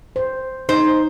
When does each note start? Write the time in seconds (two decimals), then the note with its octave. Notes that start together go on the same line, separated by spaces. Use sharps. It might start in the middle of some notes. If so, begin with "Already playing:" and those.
0.16 C5
0.69 D#4 C5